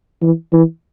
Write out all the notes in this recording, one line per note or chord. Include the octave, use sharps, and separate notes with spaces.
E3
E3